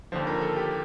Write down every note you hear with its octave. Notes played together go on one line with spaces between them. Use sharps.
D#2 D3 F3 C5
A#4
A4
G4